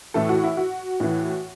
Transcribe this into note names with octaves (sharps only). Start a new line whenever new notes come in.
A2 E3 A3 A4
F#4
E4
F#4
A2 E3